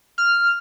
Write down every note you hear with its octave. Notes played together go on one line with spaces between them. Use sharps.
F6